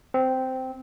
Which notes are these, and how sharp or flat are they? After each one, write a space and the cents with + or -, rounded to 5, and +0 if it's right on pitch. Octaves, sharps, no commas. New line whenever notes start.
C4 -10